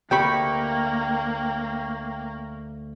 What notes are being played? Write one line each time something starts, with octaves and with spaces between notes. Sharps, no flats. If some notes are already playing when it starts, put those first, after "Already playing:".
D2 A#3 G4 G5 B5 C#6